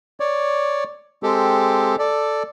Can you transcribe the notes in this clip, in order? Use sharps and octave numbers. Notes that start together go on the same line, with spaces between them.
C#5 D5
G#3 C4 G4 A4
A4 D5